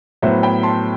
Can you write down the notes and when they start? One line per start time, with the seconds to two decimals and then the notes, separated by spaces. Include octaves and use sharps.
0.22 A2 F#3 B3 C5 E5
0.43 G5 B5
0.63 A5 C6